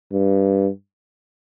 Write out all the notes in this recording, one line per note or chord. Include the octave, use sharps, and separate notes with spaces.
G2